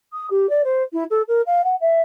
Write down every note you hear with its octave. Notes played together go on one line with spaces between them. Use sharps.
D#6
G4
D5
C5
E4
A4
A#4
F5
F#5
E5